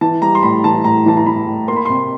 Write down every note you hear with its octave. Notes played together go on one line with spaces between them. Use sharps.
E3 A5
G3 A#5
C6
A2 B5
E3 A5
A2 A#5
E3 A5
A#5
E3 B5
A2
A#3 C6
B5
C3 C6